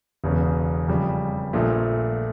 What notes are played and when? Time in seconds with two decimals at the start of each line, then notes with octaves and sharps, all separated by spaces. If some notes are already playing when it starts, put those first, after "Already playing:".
0.24 E1 E2 C#3
0.88 F2 C#3 G3
1.53 A#1 A#2 F3 A3